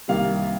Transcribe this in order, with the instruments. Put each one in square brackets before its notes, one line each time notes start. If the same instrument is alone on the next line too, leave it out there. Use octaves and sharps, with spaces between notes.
[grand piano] C2 C3 D#3 G3 A#3 F5